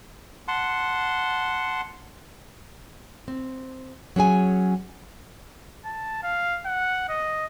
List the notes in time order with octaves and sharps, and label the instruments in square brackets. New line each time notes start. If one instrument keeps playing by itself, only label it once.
[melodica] F#5 A5 C6
[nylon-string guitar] C4
F#3 C#4 G#4 G#5
[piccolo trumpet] A5
F5
F#5
D#5